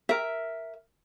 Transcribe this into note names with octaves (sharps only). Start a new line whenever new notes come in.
A#4 E5